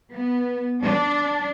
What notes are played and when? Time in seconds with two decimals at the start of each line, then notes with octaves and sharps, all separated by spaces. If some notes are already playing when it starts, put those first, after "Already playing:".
0.14 B3
0.83 D4